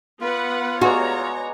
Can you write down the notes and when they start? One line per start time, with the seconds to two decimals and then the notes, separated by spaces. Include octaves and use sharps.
0.21 B3 F4 B4 F#5
0.81 G#3 B3 F#4 C#5 D5 A#5